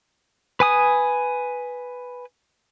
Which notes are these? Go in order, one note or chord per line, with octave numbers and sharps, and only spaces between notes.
B4 G#5 D#6